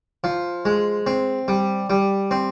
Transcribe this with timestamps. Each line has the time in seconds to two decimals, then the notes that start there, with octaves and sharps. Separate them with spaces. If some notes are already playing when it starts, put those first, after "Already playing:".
0.24 F3
0.65 G#3
1.07 C4
1.48 G3
1.90 G3
2.31 C4